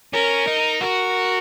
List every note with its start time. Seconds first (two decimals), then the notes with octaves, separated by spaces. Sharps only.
0.13 C#4 A#4
0.47 D#4
0.81 F#4 A#4